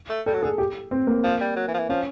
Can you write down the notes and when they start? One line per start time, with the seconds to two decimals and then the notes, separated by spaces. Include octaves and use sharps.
0.10 A3
0.26 G3 A4
0.34 F#3
0.43 D3 G#4
0.58 G4
0.91 C4
1.07 A#3
1.24 F3
1.41 G3
1.56 F#3
1.68 E3
1.74 F3
1.78 E3
1.89 F3 C#4